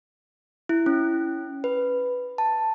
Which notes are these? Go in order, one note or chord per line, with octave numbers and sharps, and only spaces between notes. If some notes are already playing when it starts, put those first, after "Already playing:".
E4
C#4
B4
A5